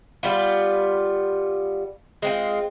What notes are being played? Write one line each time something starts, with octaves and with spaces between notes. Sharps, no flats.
G3 B3 F4
G#3 C4 F4